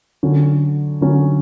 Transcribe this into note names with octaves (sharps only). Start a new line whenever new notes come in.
D3 F#3 C#4
D3 F#3 C#4